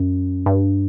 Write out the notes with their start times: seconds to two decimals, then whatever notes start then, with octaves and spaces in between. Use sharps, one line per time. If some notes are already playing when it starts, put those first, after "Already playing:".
Already playing: F#2
0.46 G2